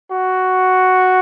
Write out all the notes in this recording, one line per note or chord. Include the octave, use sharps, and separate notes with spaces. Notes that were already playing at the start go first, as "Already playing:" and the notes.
F#4